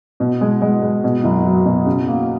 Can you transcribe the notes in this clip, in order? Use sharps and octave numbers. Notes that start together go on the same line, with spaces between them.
B2
G#3
G#3
G#3
B2
F#1
F#3
B2
C#3
A#3